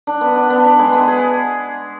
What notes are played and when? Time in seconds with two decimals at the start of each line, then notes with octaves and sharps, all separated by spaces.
0.07 D4
0.21 B3
0.36 D4
0.50 B3
0.65 D4
0.79 G#3
0.93 B3
1.08 G#4